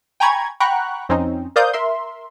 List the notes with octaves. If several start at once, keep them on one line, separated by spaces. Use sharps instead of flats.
G5 G#5 A#5 B5 C#6 G#6
F#5 G5 A#5 B5 C#6 F#6
F2 C4 C#4 D#4
A#4 C5 D5 F5 D#6 G6
A#4 E5 C6